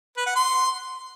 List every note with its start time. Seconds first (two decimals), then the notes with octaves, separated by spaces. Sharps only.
0.17 B4
0.26 F#5
0.36 C6